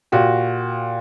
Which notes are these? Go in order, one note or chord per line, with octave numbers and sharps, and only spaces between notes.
A#2 F#4 G4